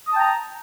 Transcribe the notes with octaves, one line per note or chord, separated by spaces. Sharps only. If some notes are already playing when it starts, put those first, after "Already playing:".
G5 A5 A#5 D#6